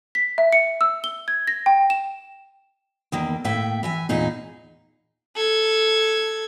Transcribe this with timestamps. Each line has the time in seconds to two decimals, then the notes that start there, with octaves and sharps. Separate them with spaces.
0.15 B6
0.38 E5
0.53 C#7
0.81 E6
1.04 G7
1.28 G#6
1.47 A#6
1.66 G5
1.90 E7
3.12 E2 D#3 A#3
3.44 A2 A#3 E5 G5
3.83 E3 E5 G#5
4.09 E2 A#2 D#4 G#4
5.36 A4 G#6